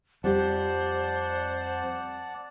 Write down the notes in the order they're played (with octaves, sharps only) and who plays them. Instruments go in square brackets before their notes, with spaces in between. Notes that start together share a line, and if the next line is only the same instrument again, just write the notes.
[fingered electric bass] F2 [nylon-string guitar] G3 G4 [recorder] C5 [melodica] D5 F#5 A5